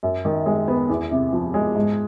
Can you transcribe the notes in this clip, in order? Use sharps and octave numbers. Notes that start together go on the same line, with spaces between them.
F#2
D#3
G#3
B3
E2
C3
F3
G#3
G#2